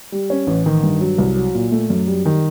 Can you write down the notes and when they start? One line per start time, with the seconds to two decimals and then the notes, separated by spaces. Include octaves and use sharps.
0.12 G3
0.30 C#4
0.47 A1
0.66 D#3
0.83 G2
1.01 F#3
1.18 C2
1.36 F#3
1.54 A#2
1.72 A3
1.90 F#2
2.07 G3
2.26 D#3